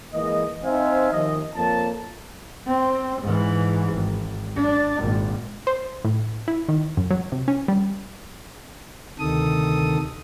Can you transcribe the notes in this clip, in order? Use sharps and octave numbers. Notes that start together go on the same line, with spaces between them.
E3 G#3 A#3 D#5
C4 D#4 C5 E5 F5 G#5
D#2 F3 D#5
F2 A#3 C#5 A5
C4
G#2 E3
G#1
D4
G#1 A#2
C5
A2
E4
D#3
F#2
F#3
C3
C#4
G3
D2 C3 D#3 A4 D#6